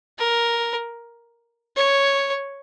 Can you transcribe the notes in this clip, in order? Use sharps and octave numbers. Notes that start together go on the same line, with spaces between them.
A#4
C#5